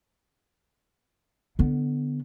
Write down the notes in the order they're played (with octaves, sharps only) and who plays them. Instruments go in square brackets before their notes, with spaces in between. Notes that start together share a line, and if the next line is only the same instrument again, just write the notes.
[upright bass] D3 B3